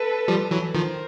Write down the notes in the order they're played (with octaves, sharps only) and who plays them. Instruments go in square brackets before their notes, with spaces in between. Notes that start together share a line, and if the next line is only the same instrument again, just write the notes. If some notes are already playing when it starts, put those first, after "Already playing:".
Already playing: [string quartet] A4 B4
[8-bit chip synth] F3 G3
E3 F#3
[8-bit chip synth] D#3 F3 [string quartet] A#4 C5